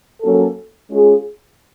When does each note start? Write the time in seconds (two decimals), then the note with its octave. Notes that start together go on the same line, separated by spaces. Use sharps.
0.22 F#3 A#3 C#4 F#4 A4
0.90 G#3 C#4 F4 G#4